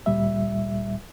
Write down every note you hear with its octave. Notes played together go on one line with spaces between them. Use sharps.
D2 A#2 G3 E5